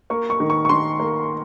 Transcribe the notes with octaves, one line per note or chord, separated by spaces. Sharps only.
A#3 C#6
C#6
D#3
C#6
C#6
D#3 C6
A#3